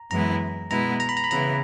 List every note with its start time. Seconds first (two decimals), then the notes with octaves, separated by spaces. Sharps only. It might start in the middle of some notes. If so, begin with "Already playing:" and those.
Already playing: A#5
0.11 F#2 E3 G#3 B3 E4 A#5
0.71 B2 G#3 B3 E4 A#5
1.00 A#5
1.09 B5
1.17 A#5
1.24 B5
1.31 C#3 E3 B3 E4 A#5